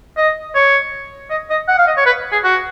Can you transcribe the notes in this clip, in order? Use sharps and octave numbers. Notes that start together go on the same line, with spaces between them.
D#5
C#5
D#5
D#5
F#5
F5
D#5
C#5
B4
G#4
F#4